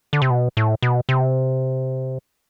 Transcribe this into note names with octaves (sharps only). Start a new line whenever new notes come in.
D3
C3
B2
A2
B2
C3